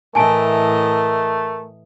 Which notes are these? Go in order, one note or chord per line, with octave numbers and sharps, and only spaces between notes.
A2 E3 A3 A#4 D#5 G#5 A5 D7